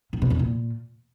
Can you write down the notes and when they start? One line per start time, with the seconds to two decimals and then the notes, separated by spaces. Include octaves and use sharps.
0.13 A#2
0.22 B2
0.30 E2
0.39 A#2